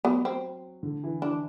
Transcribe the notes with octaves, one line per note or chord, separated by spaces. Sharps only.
F#3 B3
C4
D3
E3
E3 D4